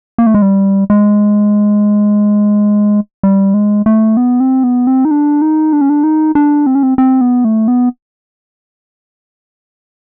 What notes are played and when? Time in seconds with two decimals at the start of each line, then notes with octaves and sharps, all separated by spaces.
0.18 A#3
0.26 A3
0.35 G#3
0.42 G3
0.90 G#3
3.23 G3
3.54 G#3
3.86 A3
4.17 B3
4.40 C4
4.64 B3
4.87 C4
5.05 D#4
5.11 D4
5.42 D#4
5.73 D4
5.81 C#4
5.89 D4
6.04 D#4
6.35 D4
6.66 C4
6.75 C#4
6.83 C4
6.98 C4
7.21 B3
7.45 A3
7.68 B3